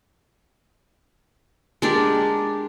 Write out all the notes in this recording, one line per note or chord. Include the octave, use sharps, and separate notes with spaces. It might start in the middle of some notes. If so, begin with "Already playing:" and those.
G#3 D4 G4 A#4